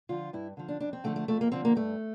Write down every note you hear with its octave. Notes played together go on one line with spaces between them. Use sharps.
D3 F3 F4
G2 E4
D3 F3
D4
F2 D4
C4
D3 F3 A3
A3
F2 A3
A#3
D3 F3 C4
A#3
G2 A3